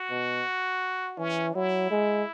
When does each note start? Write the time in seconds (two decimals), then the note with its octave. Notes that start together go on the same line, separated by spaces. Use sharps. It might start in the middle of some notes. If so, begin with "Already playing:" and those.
Already playing: F#4
0.10 B2
1.18 E3 C#4
1.55 F#3 E4
1.91 G#3